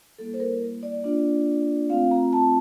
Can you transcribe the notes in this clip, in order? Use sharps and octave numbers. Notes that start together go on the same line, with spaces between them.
G3 A#3 E4 A4
C5
A#4
D5
A#3 D4 F4
A3 C4 F4 F5
A#5
A5